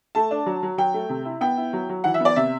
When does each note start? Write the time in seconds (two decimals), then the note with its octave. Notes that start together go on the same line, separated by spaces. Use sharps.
0.15 A3 A5
0.31 D4
0.46 F#3
0.63 F#3
0.78 F#3 G5
0.94 A3
1.09 C3
1.25 E4
1.41 B3 G5
1.57 E4
1.73 F#3
1.89 F#3
2.04 E3 F#5
2.14 E5
2.20 B3
2.25 D5
2.36 C3 E5